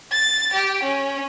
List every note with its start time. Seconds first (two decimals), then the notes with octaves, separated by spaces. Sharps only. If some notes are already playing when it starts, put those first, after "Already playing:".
0.11 A6
0.53 G4
0.83 C#4